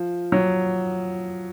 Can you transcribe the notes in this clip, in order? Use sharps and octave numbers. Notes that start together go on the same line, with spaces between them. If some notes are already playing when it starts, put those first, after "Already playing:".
Already playing: F3
F#3